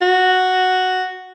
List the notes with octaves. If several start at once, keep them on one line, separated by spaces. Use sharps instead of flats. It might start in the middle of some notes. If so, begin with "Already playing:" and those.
F#4